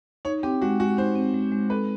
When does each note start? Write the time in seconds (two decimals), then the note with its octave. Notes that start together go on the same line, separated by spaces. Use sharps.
0.25 D#4 C#5
0.43 C4 G4
0.61 G#3 F#4
0.80 G#3 F#4
0.97 D#4 C5
1.15 C4
1.34 G#3
1.52 G#3
1.70 A4 B4